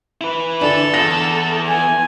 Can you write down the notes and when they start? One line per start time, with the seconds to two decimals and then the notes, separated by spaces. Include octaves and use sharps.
0.21 E4 B4
0.61 D3 D4 A4
0.94 E2 A#6
1.68 G#5